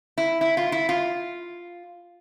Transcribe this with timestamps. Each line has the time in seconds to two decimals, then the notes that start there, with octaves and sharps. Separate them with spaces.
0.18 E4
0.41 E4
0.57 F4
0.72 E4
0.89 F4